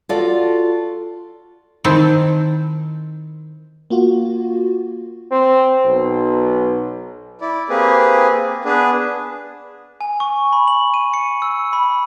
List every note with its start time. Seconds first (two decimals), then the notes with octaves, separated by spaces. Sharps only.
0.09 F4 F#4 A4 D5
1.84 D#3 C4 E4 A5
3.90 A#3 F4 F#4
5.32 C4
5.86 B1
7.41 E4 D5
7.69 A#3 C4 G4 G#4 B4
8.65 B3 D4 G#4 B4
10.01 G#5
10.20 C#6
10.53 B5
10.68 F#7
10.94 D#7
11.14 C#7
11.42 E6
11.73 B5